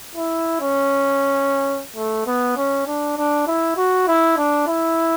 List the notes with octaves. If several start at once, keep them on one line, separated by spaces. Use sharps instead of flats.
E4
C#4
A3
B3
C#4
D4
D4
E4
F#4
E4
D4
E4